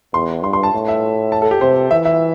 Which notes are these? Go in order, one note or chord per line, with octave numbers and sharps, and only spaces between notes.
E2 C6
G2 C6
C6
A5
A2
E5
A5
A4
G4
C3 C5
E3 E5
E5